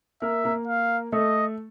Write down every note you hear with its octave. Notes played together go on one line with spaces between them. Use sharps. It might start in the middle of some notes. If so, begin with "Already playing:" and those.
A#3 A#4 E5
A#3 A#4
F5
A3 A4 D#5